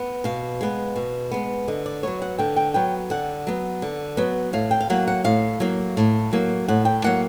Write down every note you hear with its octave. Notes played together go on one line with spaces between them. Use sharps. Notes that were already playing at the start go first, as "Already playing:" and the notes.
Already playing: B3
B2 F5
G#3 B3
B2
G#3 B3
D3 D#5
D5
F#3 B3 C#5
F#5
D3 G5
G5
F#3 B3 G5
D3 F#5
F#3 B3
D3
F#3 B3
A2 F5
G5
F5
F#3 A#3 F#5
F#5
A2 F5
F#3 A#3
A2
F#3 A#3
A2 F#5
G5
F#3 A#3 F#5